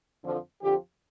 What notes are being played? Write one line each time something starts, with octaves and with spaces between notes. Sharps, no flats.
F2 D3 F3
F2 D3 F3 G4